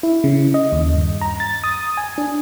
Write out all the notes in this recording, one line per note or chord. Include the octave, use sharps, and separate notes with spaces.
E4
C#3
D#5
D#2
G2
A#5
A6
D#6
G#5
D4